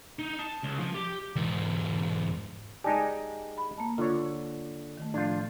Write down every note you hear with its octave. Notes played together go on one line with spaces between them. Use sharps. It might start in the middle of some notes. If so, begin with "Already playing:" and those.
D#4
A5
C#2
F3
G4
E2 G#2
G#3 D#4 G4 D5 G#5 A5
B5
A#3 A5
D3 F4 C#5
D#3 A3
A2 F3 D4 F4 G6